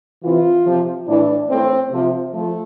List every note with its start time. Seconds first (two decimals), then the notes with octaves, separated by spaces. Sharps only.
0.23 C3 E3 F4
0.65 C3 F3
1.07 A2 E3 D4
1.49 A2 E3 C4
1.91 C3 F3
2.32 F3 A3